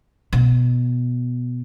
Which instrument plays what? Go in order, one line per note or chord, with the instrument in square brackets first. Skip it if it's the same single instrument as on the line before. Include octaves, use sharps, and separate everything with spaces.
[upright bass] B2